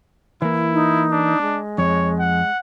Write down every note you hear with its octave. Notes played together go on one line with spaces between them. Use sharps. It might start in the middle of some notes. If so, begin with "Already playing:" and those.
E3 A#3 E4
D#4
D4
G#3
F2 C#5
F#5